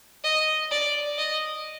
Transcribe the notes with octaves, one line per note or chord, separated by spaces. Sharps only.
D#5
D5
D#5